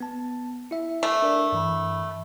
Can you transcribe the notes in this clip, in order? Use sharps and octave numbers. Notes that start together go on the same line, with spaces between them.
B3 A5
E4 E5
A3
D4 A#4 D5
G2 E3 B5